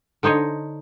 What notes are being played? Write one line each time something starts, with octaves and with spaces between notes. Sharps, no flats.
D3 D#4 C5 C#5 D#5